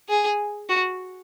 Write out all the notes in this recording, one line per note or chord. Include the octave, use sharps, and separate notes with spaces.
G#4
F#4